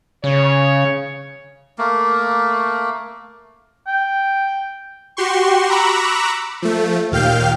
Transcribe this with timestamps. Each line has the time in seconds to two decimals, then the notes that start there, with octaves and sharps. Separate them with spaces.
0.24 C#3 C#5
1.78 A3 A#3
3.87 G5
5.17 F#4 G4 C6 C#6
5.69 A#5 B5 C#6 D6 E6 F#6
6.62 F3 A3
7.12 D#2 A#2 F5 G5 F6 G6